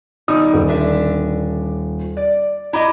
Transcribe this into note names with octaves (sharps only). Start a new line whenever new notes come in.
B2 D#3 G3 D#4 D#6
D#1
D3 D4 E5
D5
E4 G4 D#5 A#5